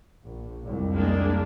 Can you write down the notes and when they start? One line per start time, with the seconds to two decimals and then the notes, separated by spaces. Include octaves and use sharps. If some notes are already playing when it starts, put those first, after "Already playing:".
0.24 A#1
0.64 C2 F2
0.92 G#3 A#3 D4